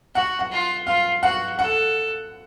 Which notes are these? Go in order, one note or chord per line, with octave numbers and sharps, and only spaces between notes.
F#4 F#5
F#5
F4
F4 F5
F#4 F#5
A4 F#5